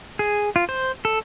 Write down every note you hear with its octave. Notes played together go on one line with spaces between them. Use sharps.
G#4
F4
C5
A4